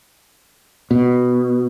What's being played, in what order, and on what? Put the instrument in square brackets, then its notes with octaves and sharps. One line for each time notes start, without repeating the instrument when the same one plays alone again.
[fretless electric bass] B2